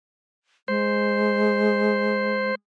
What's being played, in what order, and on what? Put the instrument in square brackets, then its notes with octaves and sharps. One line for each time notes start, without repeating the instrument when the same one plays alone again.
[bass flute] G#3 [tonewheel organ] C5